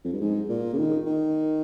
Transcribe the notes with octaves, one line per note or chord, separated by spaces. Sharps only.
F2
G2
G#2
A#2
C#3
D#3
D#3